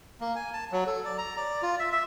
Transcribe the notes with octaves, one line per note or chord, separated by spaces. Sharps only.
A#3
G#5
A5
F#3
A4
D5
A#5
D5
F4
E5
E5